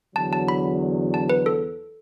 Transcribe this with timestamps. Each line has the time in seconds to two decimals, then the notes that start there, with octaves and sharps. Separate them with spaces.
0.16 E2 D3 F#3 A5
0.33 A5
0.48 B5
1.14 A5
1.30 B4
1.46 A4